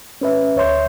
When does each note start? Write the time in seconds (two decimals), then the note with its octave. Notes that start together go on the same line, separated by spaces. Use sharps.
0.21 C#4 B4 E5
0.56 D2 C#5 E5 C6 G6